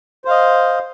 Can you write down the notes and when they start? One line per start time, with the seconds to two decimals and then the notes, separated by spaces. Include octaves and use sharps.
0.25 C5
0.28 F5
0.30 D#5